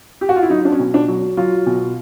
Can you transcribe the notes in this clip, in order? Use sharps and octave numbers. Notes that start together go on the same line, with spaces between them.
G4
F#4
F4
E4
F#3 D#4
D4
C#4
B2
D4
F#3
F#3 F4
B2